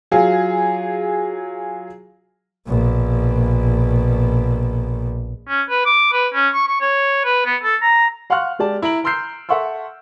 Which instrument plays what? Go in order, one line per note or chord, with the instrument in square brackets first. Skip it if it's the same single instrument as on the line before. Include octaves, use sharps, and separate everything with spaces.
[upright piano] F#3 F4 G#4
[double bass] A#1 B2
[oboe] C#4
B4
D6
B4
C#4
C#6
C#6
C#5
B4
B3
A4
A#5
[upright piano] F5 F#5 C6 C#6 F6 F#6
G#3 G4 D5 A5
E4 A#5 D7 F#7
A#5 C6 E6 F6 G6 C7
A4 E5 F#5 C6 C#6 E6